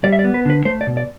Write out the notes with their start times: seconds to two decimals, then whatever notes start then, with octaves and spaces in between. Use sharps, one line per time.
0.04 G3 D5
0.12 E5
0.19 D5
0.24 B3
0.34 B4
0.45 D3 B4
0.65 A3 C5
0.81 D5
0.87 B2
0.97 D5